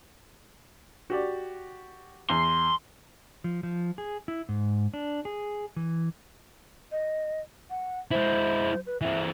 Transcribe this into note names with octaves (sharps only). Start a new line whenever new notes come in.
F#4 G4 D5
E2 C6
F3
F3
G#4
E4
G#2
D4
G#4
E3
D#5
F#5
G#3 E4 C5
B4
E3 C4 E5